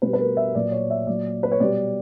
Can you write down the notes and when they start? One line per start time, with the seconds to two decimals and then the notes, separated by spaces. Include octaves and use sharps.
0.02 B2 G3 B4
0.13 B4
0.20 A#4
0.37 E5
0.55 A#2 F#3 D5
0.72 C#5
0.90 E5
1.07 A#2 F#3 D5
1.43 B4
1.52 C#5
1.60 B2 G3 D5